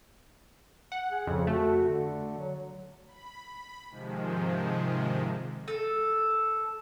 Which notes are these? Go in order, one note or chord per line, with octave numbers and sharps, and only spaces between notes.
F#5
G#4
F2 C#3
A3 F#4
D3
F#3
B5
B5
G#2 C3 D#3 F3 G#3
A4